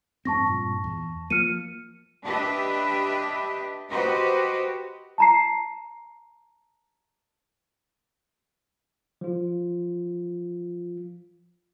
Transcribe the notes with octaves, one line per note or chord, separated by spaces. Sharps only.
F2 G#2 C4 A5 C#6 A#6
G2 A#2
E2
F3 A#3 F6 C#7 D#7
D4 G4 B4 D#5 E5
F#4 G4 B4 C5 D#5
A5 A#5 C7
F3 F4